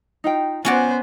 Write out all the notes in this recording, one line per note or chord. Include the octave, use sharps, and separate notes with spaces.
D#4 F4 G5
B3 C#4 F4 F#4 B4 C5 D5 F#5